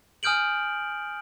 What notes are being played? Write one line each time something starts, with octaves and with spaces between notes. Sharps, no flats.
G#5 D#6 F6 G6 D7 F#7